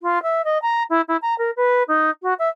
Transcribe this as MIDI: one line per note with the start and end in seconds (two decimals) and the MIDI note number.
0.03 0.22 65
0.23 0.42 76
0.45 0.58 75
0.62 0.83 82
0.90 1.01 64
1.08 1.17 64
1.22 1.35 82
1.38 1.51 70
1.57 1.83 71
1.88 2.10 63
2.22 2.34 66
2.39 2.49 76